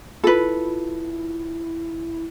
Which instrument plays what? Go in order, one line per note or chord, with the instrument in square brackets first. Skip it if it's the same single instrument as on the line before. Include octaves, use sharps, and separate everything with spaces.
[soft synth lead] E4 [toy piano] F4 [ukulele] A4 B4